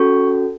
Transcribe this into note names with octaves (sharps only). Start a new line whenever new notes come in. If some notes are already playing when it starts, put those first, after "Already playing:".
Already playing: C#4 F#4 A4 C#6